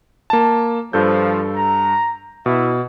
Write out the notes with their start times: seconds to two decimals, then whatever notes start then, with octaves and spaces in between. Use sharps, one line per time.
0.30 A#3 A5
0.93 G2 F3 A4 G6
1.56 A#5
2.46 B2 E4